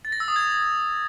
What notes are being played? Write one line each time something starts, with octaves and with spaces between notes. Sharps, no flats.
A6
A#6
E6
D#6
G#6